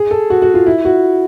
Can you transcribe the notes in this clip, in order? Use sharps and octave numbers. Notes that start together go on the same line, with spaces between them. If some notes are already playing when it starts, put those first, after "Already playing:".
Already playing: G#4
A4
F#4
F#4
F4
E4
F#4